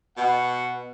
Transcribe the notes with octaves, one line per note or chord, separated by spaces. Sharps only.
B2 F#5